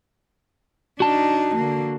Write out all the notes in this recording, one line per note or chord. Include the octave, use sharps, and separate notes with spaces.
D4 D#4 F#4 A5
D3 A#3